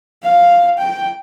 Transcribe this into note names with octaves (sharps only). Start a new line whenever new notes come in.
F5
G5